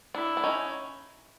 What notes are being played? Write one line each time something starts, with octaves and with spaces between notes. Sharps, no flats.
D4 E4
D4
C#4 D#4